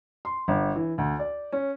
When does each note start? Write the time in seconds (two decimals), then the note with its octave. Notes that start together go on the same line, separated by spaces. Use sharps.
0.25 C6
0.48 G1
0.76 E3
0.98 D2
1.19 D5
1.52 C#4